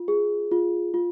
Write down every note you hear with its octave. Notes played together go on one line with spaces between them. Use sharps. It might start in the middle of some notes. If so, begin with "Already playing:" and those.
Already playing: F4
G#4
F4
F4